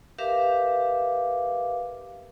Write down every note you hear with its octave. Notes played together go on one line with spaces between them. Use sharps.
G4 A#4 B4 E5 F5 D6